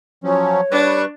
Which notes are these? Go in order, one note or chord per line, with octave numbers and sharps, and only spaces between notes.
F3 F#3 C#4 C#5
G3 D4 B4 C#6